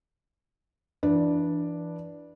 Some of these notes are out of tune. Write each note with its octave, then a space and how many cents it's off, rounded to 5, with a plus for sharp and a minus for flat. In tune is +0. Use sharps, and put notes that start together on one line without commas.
E3 +25 D4 +0 B4 -20